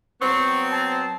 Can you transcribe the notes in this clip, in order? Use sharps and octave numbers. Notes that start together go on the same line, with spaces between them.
F#3 B3 C4 C#6
A5